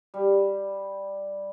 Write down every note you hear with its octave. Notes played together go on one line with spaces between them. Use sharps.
G3